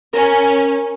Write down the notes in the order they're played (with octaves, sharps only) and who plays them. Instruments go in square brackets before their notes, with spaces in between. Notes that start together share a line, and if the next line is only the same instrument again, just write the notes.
[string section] C#4 [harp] A#4